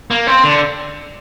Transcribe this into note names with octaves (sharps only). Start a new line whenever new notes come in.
A#3
C4
D3